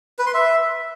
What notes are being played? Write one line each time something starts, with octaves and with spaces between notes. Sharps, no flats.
B4
C6
E5